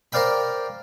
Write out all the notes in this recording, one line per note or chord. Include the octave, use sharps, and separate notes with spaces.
A#4 C5 D5 F5 G5 B5